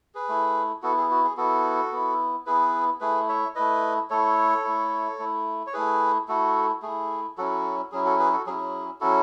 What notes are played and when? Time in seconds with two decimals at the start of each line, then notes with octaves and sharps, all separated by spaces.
0.15 G#4 B4
0.29 A3 E4
0.82 B3 E4 F#4 A4
0.97 G#4
1.11 F#4
1.24 G#4
1.37 B3 E4 F#4 A4
1.92 B3 E4
2.46 B3 E4 G#4 B4
3.01 A3 E4 G#4 B4
3.29 C#5 E5
3.55 A3 E4 B4 D#5
4.10 A3 E4 A4 C#5
4.64 A3 E4
5.19 A3 E4
5.67 C#5
5.73 A3 E4 G#4 B4
6.28 A3 E4 F#4 A4
6.82 A3 E4 G#4
7.37 F#3 C#4 E4 F#4 A4
7.92 F#3 C#4 E4 G#4
8.05 F#4 A4
8.19 G#4 B4
8.33 F#4 A4
8.46 F#3 C#4 E4 G#4
9.01 F#3 C#4 E4 F#4 A4